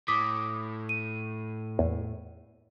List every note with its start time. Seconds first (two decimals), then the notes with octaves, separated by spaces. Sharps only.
0.08 A2 D6 D#6 B6
0.89 D#7
1.79 E2